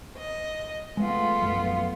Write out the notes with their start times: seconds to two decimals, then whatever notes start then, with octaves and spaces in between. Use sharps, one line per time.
0.17 D#5
0.97 G#3 A3 B3 F4
1.41 A#1 F#2 F#3